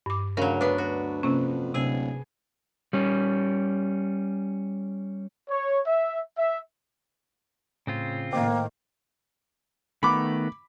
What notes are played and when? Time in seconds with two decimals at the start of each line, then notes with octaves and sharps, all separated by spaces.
0.06 G2 D6
0.37 D2 C#3 F#3 A#4 F5
0.61 B3 D4 B4
0.78 F#4
1.23 F2 C3 A#3 C#4
1.75 D1 C3 G#4
2.93 G3 C#4
5.49 C#5
5.86 E5
6.37 E5
7.87 A2 C#3 C4 F4
8.33 A2 D#3 A#3 C5 G5 D6
10.03 D#3 A3 B3 B5 D6